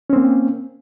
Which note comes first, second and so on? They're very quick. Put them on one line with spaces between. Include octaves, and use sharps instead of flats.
C#4 C4 A#3